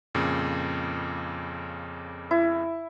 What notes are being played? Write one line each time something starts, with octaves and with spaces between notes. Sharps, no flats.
F2 A#2 C#3
E4